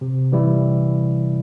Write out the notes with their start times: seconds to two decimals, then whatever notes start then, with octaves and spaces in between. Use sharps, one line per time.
0.01 C3
0.32 E3 G3 E4